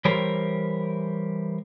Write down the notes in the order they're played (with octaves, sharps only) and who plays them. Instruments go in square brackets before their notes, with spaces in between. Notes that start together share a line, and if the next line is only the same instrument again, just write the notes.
[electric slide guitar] E3 G3 G4 A#4 C5 C#5